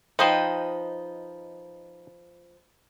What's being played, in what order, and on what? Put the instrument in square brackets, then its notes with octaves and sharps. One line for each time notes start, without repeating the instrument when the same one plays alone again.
[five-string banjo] F3 [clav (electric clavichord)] D#4 C5 [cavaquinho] B4 D#5 G5